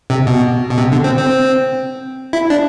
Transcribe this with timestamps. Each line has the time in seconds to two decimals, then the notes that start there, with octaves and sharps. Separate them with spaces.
0.10 C3
0.27 B2
0.70 B2
0.78 C3
0.92 D3
1.04 C4
1.17 C4
2.33 E4
2.50 D4